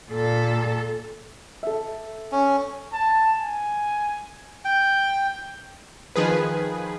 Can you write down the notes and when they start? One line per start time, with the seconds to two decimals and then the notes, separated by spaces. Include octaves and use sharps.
0.12 A#2 A4
1.63 A4 E5
2.32 C#4
2.93 A5
3.39 G#5
4.65 G5
6.16 D#3 F3 G#4 B4